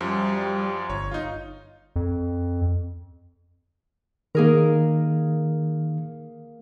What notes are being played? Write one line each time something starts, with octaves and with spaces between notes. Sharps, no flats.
F#2 F3 G3
G1 C#5
D#4 F4
F2
D#3 A#3 G#4 A#4